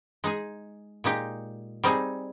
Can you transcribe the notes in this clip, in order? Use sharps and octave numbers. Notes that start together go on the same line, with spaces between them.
G#3 D#4 G#4
A#2 G#3 D#4 G4
G3 C4 D#4 G#4